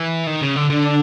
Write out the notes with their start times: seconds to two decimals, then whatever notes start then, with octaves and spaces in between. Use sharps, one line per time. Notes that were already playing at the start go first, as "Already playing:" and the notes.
Already playing: E3
0.27 D#3
0.42 C#3
0.56 D3
0.70 D3 D4